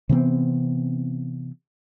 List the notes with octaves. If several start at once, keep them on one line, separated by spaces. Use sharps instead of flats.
C3 E3 B3 C4